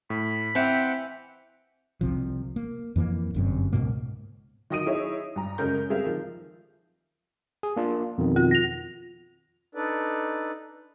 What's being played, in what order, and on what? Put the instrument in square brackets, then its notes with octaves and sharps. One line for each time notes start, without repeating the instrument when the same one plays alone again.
[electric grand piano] A2 [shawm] B5
[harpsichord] E3 [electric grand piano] C4 [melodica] F#5 G5
[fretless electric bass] C2 C3 F3
A#3
F2 E3 A3 A#3
G1 F#2 C3
C#2 G#2 B2 A#3
[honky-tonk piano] D#3 F#3 D#5 D#6 D7 D#7
D#4 E4 G#4 C#5 E5
G2 A#5
F#2 C#3 G#3 C#4 A#4 G6
G3 C4 G#4 A#4 E5 F5
D#3 F3
[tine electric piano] G#4
A#3 D4 F4
F2 B2 D#3
[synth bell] F4
A#6 F7
[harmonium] D4 D#4 A4 B4 D5